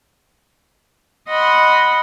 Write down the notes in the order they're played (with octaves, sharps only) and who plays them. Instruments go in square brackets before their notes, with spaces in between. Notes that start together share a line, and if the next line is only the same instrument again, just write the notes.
[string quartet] D#5 F#5 B5 C6